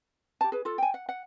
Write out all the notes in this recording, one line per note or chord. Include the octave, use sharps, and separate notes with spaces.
G4 A5
G#4 B4
F4 A4
G5 G#5
F#5
F#5